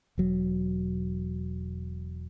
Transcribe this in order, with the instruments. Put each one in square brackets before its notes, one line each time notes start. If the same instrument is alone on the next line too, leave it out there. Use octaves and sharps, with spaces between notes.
[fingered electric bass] E1 F#3